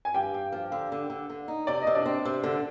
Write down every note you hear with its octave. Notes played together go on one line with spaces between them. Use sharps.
G#5
G2 G4 G5
G2
F3
D3
D3
D3
D3
D#4
C3 D5
D#5
C3
D4 D5
C4
C3
D3